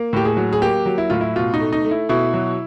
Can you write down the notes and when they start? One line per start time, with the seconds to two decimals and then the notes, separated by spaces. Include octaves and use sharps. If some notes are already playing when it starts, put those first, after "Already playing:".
Already playing: A#3
0.13 A2 G4
0.25 G#4
0.37 F#3
0.53 G#4
0.62 A#3 G4
0.86 F#3
0.98 E4
1.10 A2 F4
1.21 E4
1.36 B2 F4
1.54 D#4
1.60 A3
1.73 D#4
1.85 A3
1.91 E4
2.09 B2 E4
2.34 F#3